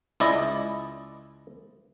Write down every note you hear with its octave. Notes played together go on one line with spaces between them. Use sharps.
C#2 E4 D5 D#5